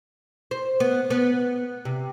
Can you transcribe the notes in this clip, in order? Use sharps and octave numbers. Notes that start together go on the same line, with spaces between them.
C5
B3
B3
C3